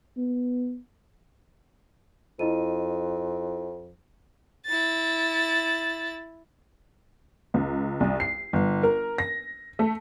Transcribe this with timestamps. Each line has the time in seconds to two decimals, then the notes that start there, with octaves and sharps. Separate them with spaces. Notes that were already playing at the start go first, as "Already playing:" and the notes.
0.17 B3
2.39 F2 E4 D#5 D#7
4.66 E4 A6
7.54 C#2
8.00 C2
8.20 C7
8.53 G1
8.83 A#4
9.18 A#6
9.79 A3